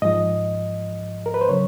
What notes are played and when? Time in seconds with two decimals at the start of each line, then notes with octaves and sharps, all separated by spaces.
0.02 G#2 F3 D#5
1.26 A#4
1.34 B4
1.41 C5
1.49 C#3 F#3 C#5